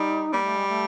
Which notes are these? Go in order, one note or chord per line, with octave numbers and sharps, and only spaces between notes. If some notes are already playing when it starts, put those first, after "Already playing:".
Already playing: G3 D#4
G3 A#3
A3
G#3
A3